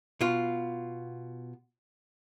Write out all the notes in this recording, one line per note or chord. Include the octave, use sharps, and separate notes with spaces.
B2 F4